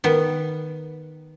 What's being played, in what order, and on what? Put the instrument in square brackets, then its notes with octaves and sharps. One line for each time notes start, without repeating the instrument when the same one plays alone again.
[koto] D#3 B3